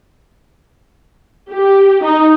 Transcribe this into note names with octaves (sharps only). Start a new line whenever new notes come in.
G4
D#4